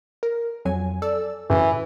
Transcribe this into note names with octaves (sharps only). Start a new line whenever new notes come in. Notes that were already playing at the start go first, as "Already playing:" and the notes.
A#4
F2 F#3 G#5
A4 D5 E6
F#2 A2 C#3 E3